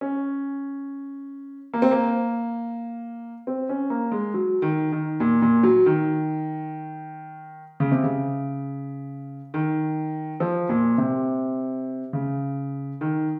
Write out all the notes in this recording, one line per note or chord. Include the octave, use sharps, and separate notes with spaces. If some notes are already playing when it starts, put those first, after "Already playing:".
C#4
A#3
C4
A#3
C4
C#4
A#3
G#3
F#3
D#3
D#3
A#2
A#2
F#3
D#3
C#3
C3
C#3
D#3
F3
A#2
C3
C#3
D#3